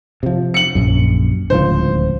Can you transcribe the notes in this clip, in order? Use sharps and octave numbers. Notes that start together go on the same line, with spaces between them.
C3 F3
C#7 F#7
A#1 F#2
D1 C#2 F3 C5